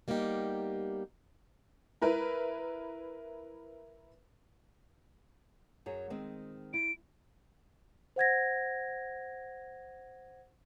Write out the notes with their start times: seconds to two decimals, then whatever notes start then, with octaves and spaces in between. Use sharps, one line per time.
0.08 G3 A#3 B3 D#4 G4
2.02 E4 A#4 B4
5.86 F#2 F#3 G#4
6.10 D#3 G#3 C4
6.74 E4 D7
8.16 C5 F#5 G#6 A#6